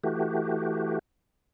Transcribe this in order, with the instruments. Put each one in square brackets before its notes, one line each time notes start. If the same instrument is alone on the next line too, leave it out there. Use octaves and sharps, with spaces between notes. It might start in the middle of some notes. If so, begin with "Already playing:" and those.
[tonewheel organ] E3 A3 F#4 G4